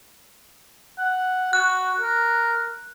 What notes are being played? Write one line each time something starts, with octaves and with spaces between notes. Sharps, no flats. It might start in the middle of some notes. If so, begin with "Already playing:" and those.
F#5
F#4 F#6
A#4